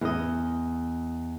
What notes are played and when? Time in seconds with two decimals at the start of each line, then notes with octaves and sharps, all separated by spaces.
0.01 E2 D#5